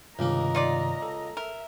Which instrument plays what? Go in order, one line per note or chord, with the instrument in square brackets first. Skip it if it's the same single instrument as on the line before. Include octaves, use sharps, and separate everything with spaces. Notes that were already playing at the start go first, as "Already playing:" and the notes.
[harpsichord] C#2 A#3 [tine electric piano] G2 C3 D#3 [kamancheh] D#5 A#5
[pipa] D#4 F4 D5
[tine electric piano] A4
[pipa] A#4 [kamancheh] E5